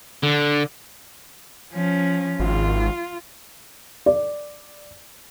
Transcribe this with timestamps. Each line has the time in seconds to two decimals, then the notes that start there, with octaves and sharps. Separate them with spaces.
0.23 D3
1.72 F3 C#4
2.39 G#1 F4
4.06 D5